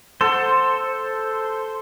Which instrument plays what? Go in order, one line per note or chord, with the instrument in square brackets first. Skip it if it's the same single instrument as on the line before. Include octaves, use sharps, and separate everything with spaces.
[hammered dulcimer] A4 [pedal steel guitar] C5